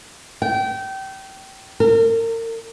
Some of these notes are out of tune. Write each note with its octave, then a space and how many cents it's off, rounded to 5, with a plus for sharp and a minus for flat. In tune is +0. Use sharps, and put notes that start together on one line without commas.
G5 -25
A#4 -35